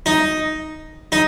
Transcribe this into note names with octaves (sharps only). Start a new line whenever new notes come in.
D#4
D#4